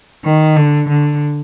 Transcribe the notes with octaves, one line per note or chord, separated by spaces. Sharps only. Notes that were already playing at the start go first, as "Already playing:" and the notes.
D#3
D3
D3